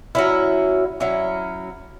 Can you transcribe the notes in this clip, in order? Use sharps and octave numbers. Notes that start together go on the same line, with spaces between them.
F#3 C#4 E4
F#3 C#4 E4